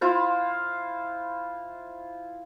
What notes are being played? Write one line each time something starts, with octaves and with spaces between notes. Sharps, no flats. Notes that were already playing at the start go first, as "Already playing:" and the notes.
E4 F4 C5